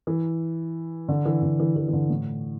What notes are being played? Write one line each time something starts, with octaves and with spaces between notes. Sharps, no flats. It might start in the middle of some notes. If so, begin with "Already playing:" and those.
E3
D3
E3
D3
E3
E3
E3
D3
A2